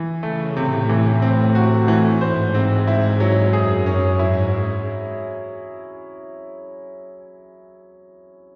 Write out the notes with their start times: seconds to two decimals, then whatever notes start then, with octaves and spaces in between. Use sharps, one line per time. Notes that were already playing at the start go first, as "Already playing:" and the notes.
Already playing: E3
0.23 C#3 A3
0.56 A2 C3
0.89 E3
1.22 C4
1.55 F#4
1.88 E3
2.21 G#2 C5
2.54 C4
2.87 G#2 E4
3.20 F#3
3.53 F#2 G#4
3.86 C#4
4.19 G#2 E4